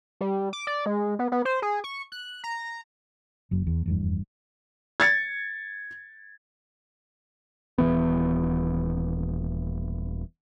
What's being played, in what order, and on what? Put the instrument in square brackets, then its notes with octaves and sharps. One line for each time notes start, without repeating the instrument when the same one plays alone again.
[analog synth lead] G3
D6
D5
G#3
B3
B3
C5
G#4
C#6
F#6
A#5
[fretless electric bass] F#1 F#2
E2
F1 E2 G2
[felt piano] G#6 A6 C#7
[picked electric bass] D#1 E2 E3 B3